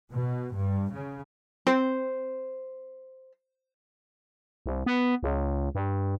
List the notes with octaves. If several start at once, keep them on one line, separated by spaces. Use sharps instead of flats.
B2
G2
C#3
C4 C5
C2
B3
C#2
G2